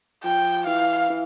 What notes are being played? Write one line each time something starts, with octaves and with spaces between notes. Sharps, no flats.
F3 G5
E3 F5
E3